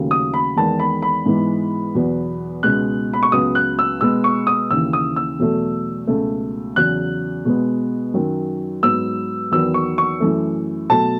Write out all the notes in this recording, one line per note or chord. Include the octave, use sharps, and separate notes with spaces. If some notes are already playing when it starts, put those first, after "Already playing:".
Already playing: D#2 C#3 F#3 A3
D#6
B5
E2 D#3 G#3 B3 A5
B5
B5
G#2 E3 G#3 B3
E2 B2 F#3 B3
C#2 B2 G#3 B3 F#6
B5
C#6
C#2 C#3 F#3 B3 D#6
F#6
E6
B2 G#3 B3 E6
C#6
D#6
D#2 C#3 E3 E6
D#6
E6
E2 B2 F#3 A3
C#2 B2 F#3 A3
E2 C#3 F#3 F#6
B2 G#3 B3
F#2 D#3 F#3
G#2 F#3 B3 E6
E2 D#3 F#3 B3 E6
C#6
C#6
F#2 E3 A3
B2 F#3 A3 A5